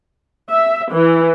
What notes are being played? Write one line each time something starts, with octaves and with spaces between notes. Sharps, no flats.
E5
E3